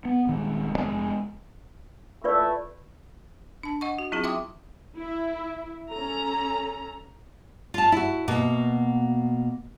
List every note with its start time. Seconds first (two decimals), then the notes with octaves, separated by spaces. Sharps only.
0.05 B3
0.27 D#1 D#3 G#3
0.72 F1 C#3 G#3
2.24 A3 E4 F4 B4 D5
3.63 D4 A5
3.81 D#5 F#5 C#6
3.98 F#4
4.12 F#3 C4 E4 F4 G#4
4.24 E5 G5 C6 D6 D#6
4.97 E4
5.91 C#4 A4 A#5
7.74 F4 A5
7.92 E4 F#4
8.28 B2 A#3 F#4